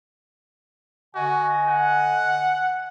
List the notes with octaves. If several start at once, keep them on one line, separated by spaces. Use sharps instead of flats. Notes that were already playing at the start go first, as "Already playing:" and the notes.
D3 F#4 D#5 G#5
F#5